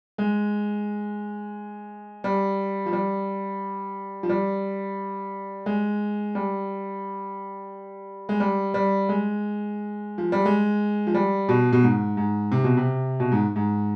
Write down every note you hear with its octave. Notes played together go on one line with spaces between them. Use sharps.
G#3
G3
F3
G3
F3
G3
G#3
G3
G#3
G3
G3
G#3
F3
G3
G#3
F3
G3
B2
B2
G#2
G#2
C3
B2
C3
B2
G#2
G#2